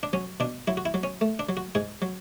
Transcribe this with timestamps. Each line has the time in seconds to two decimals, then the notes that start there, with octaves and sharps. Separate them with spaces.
0.03 D4
0.13 F#3 C#4
0.40 B2 D4
0.67 F#3 E4
0.77 F#4
0.85 E4
0.94 F#3
1.03 C#4
1.21 A3
1.39 D4
1.49 F#3
1.57 F#4
1.75 G#2 G#4
2.02 F#3